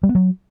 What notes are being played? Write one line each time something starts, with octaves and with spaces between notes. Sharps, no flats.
G3
B3
F#3